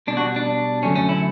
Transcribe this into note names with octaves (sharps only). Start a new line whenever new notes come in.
B2 G3 D4
F#4
D4
F#2 D3 F#3 A3 C#4
C#4
E4